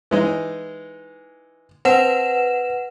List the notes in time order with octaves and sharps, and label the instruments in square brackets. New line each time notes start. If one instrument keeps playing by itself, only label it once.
[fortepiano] E3 G#3 D#4
[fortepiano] C4 [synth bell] B4 F#5 E7